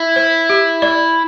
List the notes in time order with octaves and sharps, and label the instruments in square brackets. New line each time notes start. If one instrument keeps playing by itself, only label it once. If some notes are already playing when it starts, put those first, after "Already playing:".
Already playing: [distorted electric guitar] E4
[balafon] C5
G4
D5